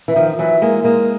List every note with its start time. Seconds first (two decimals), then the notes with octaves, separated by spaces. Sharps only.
0.08 E3
0.16 D#3 F3
0.39 E3 F#3
0.62 G#3 A#3
0.84 G#3 A#3